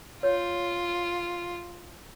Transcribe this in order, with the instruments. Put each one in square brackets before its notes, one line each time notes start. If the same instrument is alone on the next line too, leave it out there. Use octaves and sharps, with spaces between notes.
[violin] F4 [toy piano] C#5